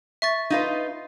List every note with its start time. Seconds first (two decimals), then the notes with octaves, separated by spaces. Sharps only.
0.22 E5 C#6 A6
0.50 D#4 F4 B4